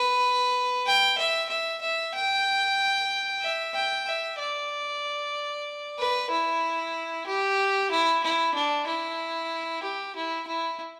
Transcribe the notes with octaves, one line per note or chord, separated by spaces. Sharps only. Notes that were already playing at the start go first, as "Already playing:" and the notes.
Already playing: B4
G5
E5
E5
E5
G5
E5
G5
E5
D5
B4
E4
G4
E4
E4
D4
E4
G4
E4
E4